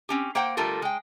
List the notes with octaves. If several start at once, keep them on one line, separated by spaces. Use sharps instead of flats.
C4 C#4 G4
A#3 C5 F#5 G5
D3 G3 A3 F4 A4 A#4
G#3 G5